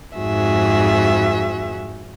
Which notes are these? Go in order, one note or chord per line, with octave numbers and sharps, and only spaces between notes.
F2 G#2 F#4 G#4 E5